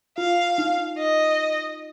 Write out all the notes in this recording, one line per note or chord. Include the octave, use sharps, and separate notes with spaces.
F4 F5
D#4
D#5